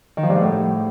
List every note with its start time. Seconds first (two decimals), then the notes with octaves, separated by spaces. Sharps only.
0.17 D#3
0.23 F3
0.29 G2
0.35 G#2
0.42 A2